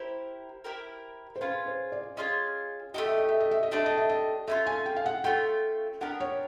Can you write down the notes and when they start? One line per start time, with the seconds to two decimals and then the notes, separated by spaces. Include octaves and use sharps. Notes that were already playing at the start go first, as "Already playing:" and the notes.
Already playing: E4 G4 A#4 C5
0.64 E4 G4 A#4
1.36 C5
1.41 C#4 F4 G#4 B4
1.66 C5
1.92 D5
2.17 C#4 F4 G#4 D#5
2.94 A3 D4 G4 D#5
3.06 E5
3.18 D#5
3.28 E5
3.40 D#5
3.51 E5
3.63 D#5
3.71 A3 D4 G4 E5
3.86 D#5
3.97 E5
4.09 D#5
4.48 A3 C#4 F4 E5
4.66 G#5
4.86 G5
4.96 F5
5.06 F#5
5.24 A3 C#4 F4 G5
6.01 B3 D4 G4 A#4 F#5
6.20 C#5